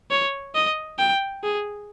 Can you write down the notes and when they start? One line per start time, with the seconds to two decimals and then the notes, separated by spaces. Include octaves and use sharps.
0.11 C#5
0.55 D#5
0.99 G5
1.43 G#4